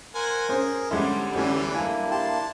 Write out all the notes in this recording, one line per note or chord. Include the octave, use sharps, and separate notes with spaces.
A#4 C5 F#5 G#5
C#4 G#4 C5
D3 G3 G#3 B3 C#4 E4 C5
D2 E3 C#4
A#3 D4 E4 G#5
G4 A5 C6